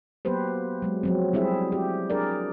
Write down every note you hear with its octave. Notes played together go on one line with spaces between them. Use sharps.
F#3 A#3 B3 G4 B4 C5
F#3 G#3
F3 F#3 C4
G3 C4 E4 G#4 E5
G4
D4 G#4 A#4 D5